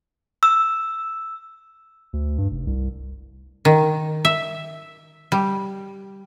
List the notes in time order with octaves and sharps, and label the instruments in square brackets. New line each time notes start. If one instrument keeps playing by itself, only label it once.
[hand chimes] E6
[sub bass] D2
G2
F1
C2
[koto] D#3
E5
G3